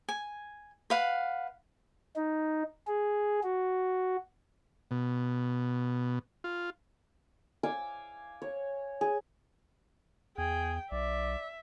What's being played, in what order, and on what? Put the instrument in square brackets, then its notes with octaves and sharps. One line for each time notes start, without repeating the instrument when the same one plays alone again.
[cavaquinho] G#5
B4 F5 F#5
[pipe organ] D#4
G#4
F#4
[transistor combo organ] B2
F4
[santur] F5 G#5 D6 E6
C#5
G#4
[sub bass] E2 [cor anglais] G#4 [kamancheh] G5
[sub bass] B1 [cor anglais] D5 [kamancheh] E5